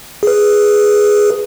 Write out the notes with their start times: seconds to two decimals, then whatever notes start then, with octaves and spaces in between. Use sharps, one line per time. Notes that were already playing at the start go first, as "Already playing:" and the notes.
0.23 G#4 B4